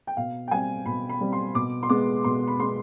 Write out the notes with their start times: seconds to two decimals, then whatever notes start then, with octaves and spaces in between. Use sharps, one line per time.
0.07 G5
0.17 B2 F5
0.48 G5
0.51 G3 C4 G#5
0.86 B2 B5
1.09 B5
1.21 G3 C4
1.32 C6
1.55 B2 D6
1.83 C6
1.89 G#3 B3 D6
2.24 B2 C6
2.48 B5
2.59 G#3 B3 C6